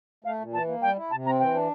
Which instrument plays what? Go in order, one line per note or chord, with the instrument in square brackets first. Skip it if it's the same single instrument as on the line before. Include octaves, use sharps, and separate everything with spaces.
[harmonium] A3 [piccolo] F5
[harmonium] A#2
[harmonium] E3 [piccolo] A5
[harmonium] A#3
[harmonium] G3 [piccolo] G5
[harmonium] E4
[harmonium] C3 [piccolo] A5
[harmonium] C4 [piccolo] A#5
[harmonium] E3 [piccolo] G5
[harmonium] D4